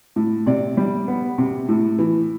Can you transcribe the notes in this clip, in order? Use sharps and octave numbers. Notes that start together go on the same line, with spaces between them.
A2
C3 D5
G3
B3
C3
A2
E3